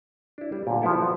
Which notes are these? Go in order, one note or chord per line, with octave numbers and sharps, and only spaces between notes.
D4 E4
G3
A#2 D3
F3 B3 E4 A4
F3 F#3